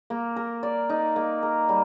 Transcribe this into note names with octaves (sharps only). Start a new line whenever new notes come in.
A#3
A#4
D5
D#4
A#3
A#4
G3